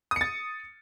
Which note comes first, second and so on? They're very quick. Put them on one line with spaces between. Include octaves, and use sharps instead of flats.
D#6 C#7 A6